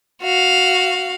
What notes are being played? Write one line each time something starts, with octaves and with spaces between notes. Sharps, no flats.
F#4 F5